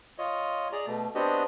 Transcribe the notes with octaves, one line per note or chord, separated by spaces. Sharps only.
F4 C#5 D#5
G#4 D5 A#5
B2 A3
B3 C4 D4 F#4 G4 D#5